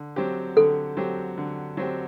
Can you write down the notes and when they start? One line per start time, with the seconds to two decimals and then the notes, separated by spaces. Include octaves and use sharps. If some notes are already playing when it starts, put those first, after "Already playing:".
Already playing: D3
0.16 F#3 C4 G4
0.57 D3 A4
0.97 F#3 C4 G4
1.38 D3
1.77 F#3 C4 G4